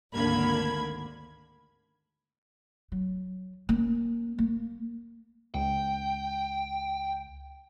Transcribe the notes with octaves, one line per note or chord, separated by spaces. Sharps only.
G#1 D2 D3 A#3 B5 G#6
F#3
A#3 C#4
A#3
C#2 G5